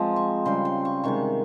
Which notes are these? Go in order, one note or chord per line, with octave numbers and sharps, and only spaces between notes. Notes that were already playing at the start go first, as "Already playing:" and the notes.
Already playing: F3 G#3 C4 A#5
C#6
C#3 G3 C4 C6
C6
C#6
C3 D#3 G#3 C#6